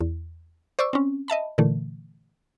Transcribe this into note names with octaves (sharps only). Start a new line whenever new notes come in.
E2
C5 D5 C#6 D6 E6
C4 C#4
D#5 E5 A5 B5
A#2 D3 E3 A3